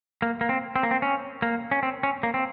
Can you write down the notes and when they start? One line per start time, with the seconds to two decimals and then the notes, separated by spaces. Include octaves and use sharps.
0.22 A#3
0.41 A#3
0.49 C4
0.76 C4
0.83 A#3
0.91 C4
1.02 C#4
1.42 A#3
1.71 C#4
1.83 C4
2.03 C#4
2.23 A#3
2.34 C4